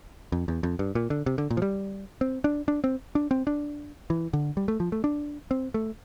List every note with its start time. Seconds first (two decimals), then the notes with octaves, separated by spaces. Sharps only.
0.32 F2
0.48 E2
0.63 F2
0.79 G2
0.95 A#2
1.10 D3
1.26 C3
1.38 D3
1.51 A#2
1.57 F3
1.62 G3
2.21 C4
2.44 D4
2.68 D4
2.84 C4
3.15 D4
3.31 C4
3.47 D4
4.10 E3
4.33 D3
4.57 G3
4.68 A3
4.80 F3
4.92 A3
5.04 D4
5.51 C4
5.74 A3